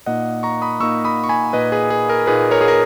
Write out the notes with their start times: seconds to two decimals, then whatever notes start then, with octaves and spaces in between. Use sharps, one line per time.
0.06 A#2 A#3 D#4 D#5 F#5
0.43 A#5 C#6
0.62 B5 D#6
0.80 A#2 A#3 D#4 C#6 E6
1.05 B5 D#6
1.24 C#6
1.29 G#5 B5
1.53 A#2 A#3 D#4 B4 D#5
1.72 G#4 B4
1.90 G#4
2.09 A#4
2.27 A#2 A#3 D#4 G#4 B4
2.51 A#4 C#5
2.61 G#4
2.68 A#4